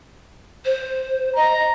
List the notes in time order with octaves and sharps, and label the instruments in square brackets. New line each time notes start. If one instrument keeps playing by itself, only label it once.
[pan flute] C5
[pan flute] D#5 [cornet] A#5